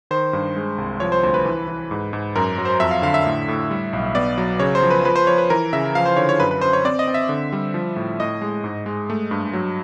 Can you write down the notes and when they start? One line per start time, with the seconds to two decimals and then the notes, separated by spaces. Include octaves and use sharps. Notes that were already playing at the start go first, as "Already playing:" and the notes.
0.11 D#3 C5
0.33 G2
0.56 G#3
0.78 C2
1.00 F3 C#5
1.12 C5
1.23 D2 C5
1.34 B4
1.45 E3
1.68 E3
1.91 G#2
2.13 G#2
2.36 F#2 A#4
2.58 F#3
2.65 C5
2.80 F2 E5
2.91 F5
3.02 D3 F5
3.14 E5
3.26 A2
3.48 A2
3.71 G3
3.93 B1
4.15 B3 D5
4.38 F#3
4.60 C#3 C#5
4.75 C5
4.83 F3
4.91 B4
5.05 F3 B4
5.16 C5
5.27 F3 C#5
5.38 B4
5.50 E3 A#4
5.73 C#3 E5
5.95 F3 F5
6.06 C5
6.17 D3 C#5
6.29 C#5
6.40 F#2 B4
6.51 B4
6.61 F#2 C5
6.73 C#5
6.85 C4 D5
6.99 D#5
7.08 C4
7.14 E5
7.29 D3
7.52 G3
7.74 F3
7.96 A2
8.20 A2 D#5
8.41 G#3
8.64 G#2
8.86 G#3
9.10 A3
9.31 G2
9.53 F#3